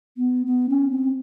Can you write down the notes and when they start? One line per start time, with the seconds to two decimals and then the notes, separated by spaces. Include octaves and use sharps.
0.17 B3
0.46 B3
0.69 C#4
0.91 C4